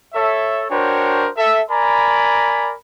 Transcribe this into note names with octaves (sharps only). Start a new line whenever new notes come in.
A4 C#5 E5
D4 F#4 A#4 C5 C#5 G5
A4 E5
A#4 D5 G#5 A#5 B5